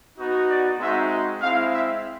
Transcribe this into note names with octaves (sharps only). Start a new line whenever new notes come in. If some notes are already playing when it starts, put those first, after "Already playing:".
B3 D#4 F#4
D5
G#3 C4 D#4 F#4 E5
G#3 C4 E4 F5
E5